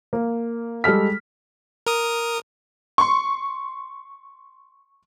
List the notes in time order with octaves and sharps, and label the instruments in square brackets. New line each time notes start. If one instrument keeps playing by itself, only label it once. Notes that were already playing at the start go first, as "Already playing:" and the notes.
[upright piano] A#3
G3 G#3 A4 F6 B6
[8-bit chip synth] A#4 D#6
[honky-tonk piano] C6 C#6